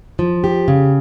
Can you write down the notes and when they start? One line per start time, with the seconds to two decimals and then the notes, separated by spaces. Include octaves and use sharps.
0.19 F3
0.44 G4
0.68 C#3